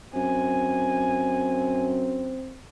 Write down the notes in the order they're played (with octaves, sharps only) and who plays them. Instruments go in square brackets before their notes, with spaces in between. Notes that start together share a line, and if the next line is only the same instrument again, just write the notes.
[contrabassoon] F#2 [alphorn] C4 [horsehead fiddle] G#5